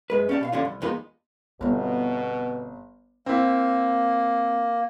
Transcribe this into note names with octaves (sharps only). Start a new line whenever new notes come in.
F#2 G#3 B4
C#4 G4 D5 E5 A5
B2 E5 F5
F#2 D3 F3 C#4 D4 F4
C2
E2 G#3 A#3 D#4 F4 B5
G1 B2 B3 C4
A#3 C4 E4